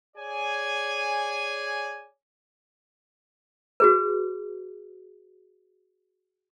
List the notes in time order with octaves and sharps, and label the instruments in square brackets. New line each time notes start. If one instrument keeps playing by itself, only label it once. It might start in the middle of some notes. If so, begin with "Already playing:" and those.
[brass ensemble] G#4 C#5 D5 G#5
[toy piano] F#4 G#4 B4